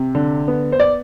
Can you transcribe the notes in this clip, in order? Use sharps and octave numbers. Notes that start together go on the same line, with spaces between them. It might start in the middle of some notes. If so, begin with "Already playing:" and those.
Already playing: C3
D3
B3
C5
D5